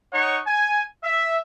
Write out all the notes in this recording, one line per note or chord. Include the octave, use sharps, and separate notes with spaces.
D#4 C#5 F#5 C#6
G#5
E5